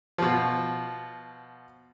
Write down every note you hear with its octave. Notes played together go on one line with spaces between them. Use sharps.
B2 F3